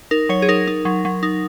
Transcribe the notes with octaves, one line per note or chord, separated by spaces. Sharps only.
D#4 A#4
F#3 C#5
G#4
D#4 A#4
D#4
F#3
F#3
D#4